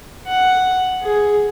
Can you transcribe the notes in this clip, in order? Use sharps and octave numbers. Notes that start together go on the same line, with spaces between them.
F#5
G#4